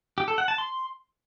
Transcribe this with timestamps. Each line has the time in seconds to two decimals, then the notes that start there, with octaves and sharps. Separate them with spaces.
0.18 G4
0.28 A4
0.38 F#5
0.48 A5
0.58 C6